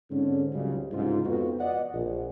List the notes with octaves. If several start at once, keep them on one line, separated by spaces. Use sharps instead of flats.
G#2 D3 C4 C#4
G#1 C#2 C#3 F#3 G3
C2 G#2 C#3 F4
F2 B3 F#4
D5 D#5 F#5
A#1